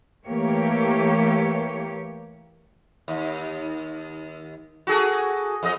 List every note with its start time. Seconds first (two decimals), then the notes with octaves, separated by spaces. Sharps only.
0.24 E3 A3 A#3 G4 C#5
3.08 D#2
4.87 F#4 G#4 A4
5.63 F2 D#5